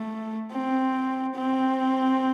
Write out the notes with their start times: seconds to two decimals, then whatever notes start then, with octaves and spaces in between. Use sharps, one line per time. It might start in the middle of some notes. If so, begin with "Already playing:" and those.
Already playing: A3
0.51 C4
1.36 C4